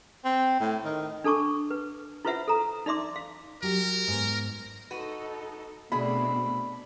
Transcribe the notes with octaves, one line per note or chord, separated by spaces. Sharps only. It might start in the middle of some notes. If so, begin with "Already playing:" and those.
C4
A2
D#3
D4 A4 A5 C#6 D6
B4
E4 F4 B4 C5 E5 F#5
A4 A#5
D#4 D5 E5 C6 D6
F5
F#3 G4 A#4
G#2 B3
D#4 F#4 A4 B4
B2 A3 C4 D4 G#4 B5